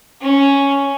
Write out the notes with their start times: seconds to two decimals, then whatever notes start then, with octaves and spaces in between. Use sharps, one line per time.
0.21 C#4